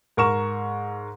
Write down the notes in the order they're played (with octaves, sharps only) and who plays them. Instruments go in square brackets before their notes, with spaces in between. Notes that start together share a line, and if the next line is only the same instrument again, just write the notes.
[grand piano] G#2 A#4 C#6 E7